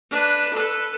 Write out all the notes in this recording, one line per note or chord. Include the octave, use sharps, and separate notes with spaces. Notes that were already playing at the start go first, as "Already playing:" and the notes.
D4 B4
A4 B4